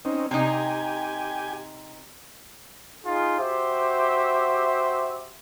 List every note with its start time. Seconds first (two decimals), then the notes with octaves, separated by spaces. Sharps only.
0.05 C4 C#4 D#4
0.31 C3 D#4 G4 G#5
3.05 D#4 F4 G#4
3.39 F#4 G4 C5 E5